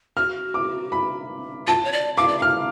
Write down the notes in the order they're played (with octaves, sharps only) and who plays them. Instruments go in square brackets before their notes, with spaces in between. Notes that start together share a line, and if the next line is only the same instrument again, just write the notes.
[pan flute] F#4 [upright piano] F6
[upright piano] D6
B5
[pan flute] F4 [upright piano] A5
[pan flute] C#5
D5
[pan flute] F5 [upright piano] D6
[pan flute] D5
[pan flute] F5 [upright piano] F6